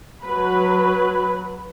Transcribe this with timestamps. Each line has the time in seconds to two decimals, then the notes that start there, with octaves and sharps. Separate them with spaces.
0.23 F#3 B4